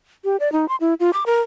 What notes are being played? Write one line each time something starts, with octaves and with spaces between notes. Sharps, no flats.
G4
D5
D#4
C6
E4
F4
D6
A#4